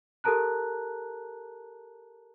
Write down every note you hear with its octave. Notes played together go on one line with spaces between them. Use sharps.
G4 A4 A#4 A5 A#5 F#6